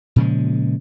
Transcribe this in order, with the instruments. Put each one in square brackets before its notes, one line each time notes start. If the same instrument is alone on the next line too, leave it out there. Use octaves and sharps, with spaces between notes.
[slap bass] A#2 C#3 F3 G#3